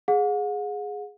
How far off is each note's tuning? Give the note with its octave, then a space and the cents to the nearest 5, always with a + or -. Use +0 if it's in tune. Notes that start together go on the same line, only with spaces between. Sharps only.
G#4 +0 F#5 -40